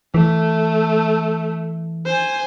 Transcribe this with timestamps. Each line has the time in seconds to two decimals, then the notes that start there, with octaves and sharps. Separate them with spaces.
0.14 E3 A3
2.06 C5 G#5